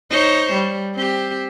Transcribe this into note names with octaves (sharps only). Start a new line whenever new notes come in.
D#4 C5 C#5
G3
C4 G4